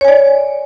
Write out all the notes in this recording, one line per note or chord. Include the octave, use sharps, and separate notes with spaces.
C#5 D5 G#5